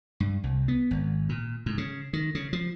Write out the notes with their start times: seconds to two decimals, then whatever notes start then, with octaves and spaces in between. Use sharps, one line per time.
0.20 G2
0.44 C2
0.68 B3
0.91 G#1
1.29 A#2
1.66 G#2
1.78 C#3
2.13 D#3
2.35 C#3
2.53 F3